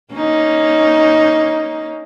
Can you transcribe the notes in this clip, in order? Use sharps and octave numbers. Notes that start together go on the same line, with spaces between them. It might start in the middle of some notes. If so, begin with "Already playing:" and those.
A#3 C#4 D#4